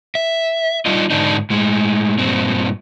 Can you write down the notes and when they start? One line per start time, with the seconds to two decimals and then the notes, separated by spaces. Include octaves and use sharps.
0.15 E5
0.86 G3 D4 D#4 F4 D#5
1.10 G#2 D3 D4 D#4
1.50 A2 G#3
2.18 G2 A#2 C4